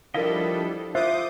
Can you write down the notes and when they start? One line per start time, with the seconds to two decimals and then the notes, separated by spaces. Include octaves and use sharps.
0.14 F3 G3 D4 E4 A4 A#4 D#5 F5
0.95 F4 C5 E5 D6 D#6 G6